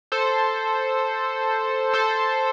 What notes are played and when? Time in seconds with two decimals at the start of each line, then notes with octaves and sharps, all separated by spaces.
0.12 A4 C5
1.94 A4 C5